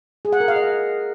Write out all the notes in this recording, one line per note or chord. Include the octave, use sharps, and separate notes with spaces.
G#4
F#5
A#4
F5
D#5